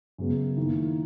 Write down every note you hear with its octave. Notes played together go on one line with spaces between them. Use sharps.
F#2 C#3 G#3 B3
D#3 A#3 E4